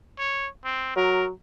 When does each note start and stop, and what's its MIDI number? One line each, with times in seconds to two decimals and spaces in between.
0.19 0.48 73
0.65 0.91 60
0.96 1.29 54
0.96 1.25 70